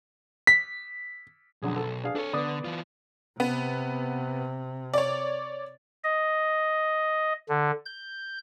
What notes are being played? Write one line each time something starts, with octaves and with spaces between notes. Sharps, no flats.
B6
B1 F#2 D3 G#4
A4
D4 G#4 F5
D4 A4 C#5
D3 B3 D5 D#6
E3 F4
C3 B3
C#5 D5
D#5
D3
G6